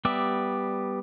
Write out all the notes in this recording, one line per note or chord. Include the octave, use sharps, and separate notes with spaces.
G3 B3 G4 D5 E5